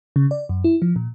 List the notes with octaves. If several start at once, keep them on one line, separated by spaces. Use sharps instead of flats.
C#3
D5
F#2
E4
F3
A#2